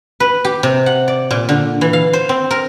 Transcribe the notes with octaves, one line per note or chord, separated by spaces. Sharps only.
B4
G4
C3
F#5
D5
A#2
D3
E3
F5
C5
C4
A#4